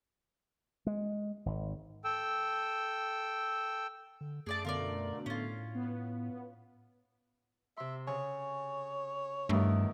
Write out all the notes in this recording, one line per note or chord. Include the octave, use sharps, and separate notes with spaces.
G#3
G#1
A4 G5 E6
D3
F#2 A3 G#4 D5 A5 D7
B2 D3 A3 F4 A#4 D5
A2 C#4 F4
B3
C3 E5 C6
C#3 C#5 G#5
E2 G2 D#3 A3